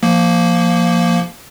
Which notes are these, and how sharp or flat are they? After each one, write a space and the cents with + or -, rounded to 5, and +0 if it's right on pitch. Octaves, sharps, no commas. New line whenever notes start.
F3 -5 A#3 +0